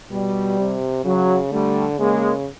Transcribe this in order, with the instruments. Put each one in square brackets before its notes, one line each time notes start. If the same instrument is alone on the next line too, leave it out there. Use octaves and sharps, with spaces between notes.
[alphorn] B2 [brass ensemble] G3
[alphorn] C3
[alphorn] C#3 [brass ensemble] F#3
[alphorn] D3 [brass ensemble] G3 A3
[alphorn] C#3 [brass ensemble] G#3 A#3